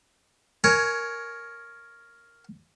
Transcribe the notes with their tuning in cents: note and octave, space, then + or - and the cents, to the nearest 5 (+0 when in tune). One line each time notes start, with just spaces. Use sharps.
A#4 +0 C#5 +0 G#5 +15